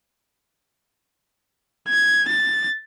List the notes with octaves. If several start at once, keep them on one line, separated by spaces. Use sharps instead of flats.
G#6
A6